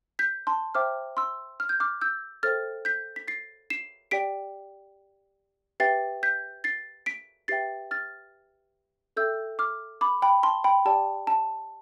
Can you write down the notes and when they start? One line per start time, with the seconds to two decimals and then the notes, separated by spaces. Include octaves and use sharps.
0.19 G6 B6
0.47 A5 C6
0.75 C5 E5 G5 D6 F6
1.17 C6 E6
1.60 F6
1.69 G6
1.80 D6 F6
2.01 E6 G6
2.43 A4 C5 E5 G5 F6 A6
2.85 G6 B6
3.16 B6
3.28 A6 C7
3.70 C7 E7
4.11 G4 D5 G5 B6 D7
5.80 G4 B4 E5 G5 A6 C7
6.23 G6 B6
6.64 A6 C7
7.06 B6 D7
7.48 G4 B4 E5 G5 A6 C7
7.91 F6 A6
9.17 A4 E5 G5 E6 G6
9.59 D6 F6
10.01 B5 D6
10.22 G5 B5
10.43 A5 C6
10.64 G5 B5
10.85 G4 D5 G5 A5
11.27 A5